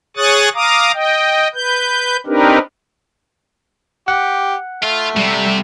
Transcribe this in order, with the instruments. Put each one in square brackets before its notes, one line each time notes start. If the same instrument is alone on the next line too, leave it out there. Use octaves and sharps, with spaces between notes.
[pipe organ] G#4 C#5 C#6 D#6 F#6 A6
F5 A#5 D6 D#6
D#5 G5
B4 G6
C4 D4 D#4 G4 A#4 B4
[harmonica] G4 [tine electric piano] F#5
[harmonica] A3 [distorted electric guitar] F4
[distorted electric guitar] C3 [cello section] G3